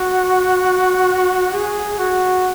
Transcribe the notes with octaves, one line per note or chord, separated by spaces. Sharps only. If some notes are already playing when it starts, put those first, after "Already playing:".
Already playing: F#4
G#4
F#4